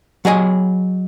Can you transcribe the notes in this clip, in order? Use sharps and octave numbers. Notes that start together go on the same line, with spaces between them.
F#3 G#4 D#5 G#5